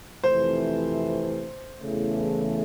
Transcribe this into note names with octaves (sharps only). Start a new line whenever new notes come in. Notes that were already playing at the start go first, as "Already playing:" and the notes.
F2 C3 E3 A3 C5
E2 C#3 E3 A3